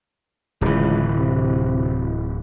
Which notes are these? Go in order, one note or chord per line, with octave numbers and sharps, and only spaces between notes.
D1 C#2 E3
C3